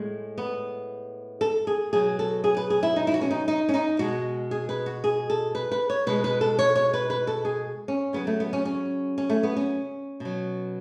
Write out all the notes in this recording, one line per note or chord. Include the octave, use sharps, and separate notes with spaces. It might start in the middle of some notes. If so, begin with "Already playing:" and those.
Already playing: A2 G#3
B3
A4
G#4
B2 F#3 G#4
A4
G#4
B4
G#4
E4
D#4
E4
F#4
C#4
D#4
D#4
C#4
D#4
B2 G#3 F#4
G#4
B4
F#4
G#4
A4
B4
B4
C#5
B2 G#3 B4
B4
A4
C#5
C#5
B4
B4
A4
G#4
C#4
C#3 F#3 B3
A3
B3
C#4
C#4
C#4
A3
B3
C#4
B2
F#3